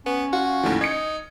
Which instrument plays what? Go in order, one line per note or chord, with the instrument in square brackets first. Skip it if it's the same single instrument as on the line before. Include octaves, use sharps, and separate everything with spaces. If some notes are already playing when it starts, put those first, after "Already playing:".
[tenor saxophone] B3 [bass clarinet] C#4
[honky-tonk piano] F4 [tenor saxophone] F#4
[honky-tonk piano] D#2 A2 F3
[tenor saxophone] D#4 [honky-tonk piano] G#6 C#7